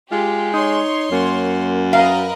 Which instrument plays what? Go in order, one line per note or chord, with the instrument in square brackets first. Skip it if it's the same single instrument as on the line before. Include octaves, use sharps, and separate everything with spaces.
[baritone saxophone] G#3 [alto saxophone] F4 [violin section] G4
[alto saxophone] D#4 [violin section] C#5 C6
[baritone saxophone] F#2 [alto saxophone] A#3
[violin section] A#4 B4 D#5 [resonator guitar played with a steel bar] F5